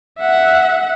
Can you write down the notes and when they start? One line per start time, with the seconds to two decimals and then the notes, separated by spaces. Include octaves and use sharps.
0.20 E5 F#5